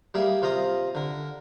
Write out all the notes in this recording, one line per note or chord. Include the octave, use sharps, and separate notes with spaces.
G3 A#3 G#4 E5 F5
C3 F4 F5 A#5 D#6
D3 A#4